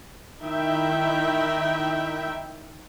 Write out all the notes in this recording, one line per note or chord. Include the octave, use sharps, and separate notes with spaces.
D#3 D#4 E4 E5 G5